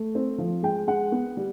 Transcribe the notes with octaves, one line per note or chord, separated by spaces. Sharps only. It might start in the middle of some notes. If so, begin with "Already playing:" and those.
Already playing: A3
C4
F3
G#3 G5
G#3 F#5
B3
G3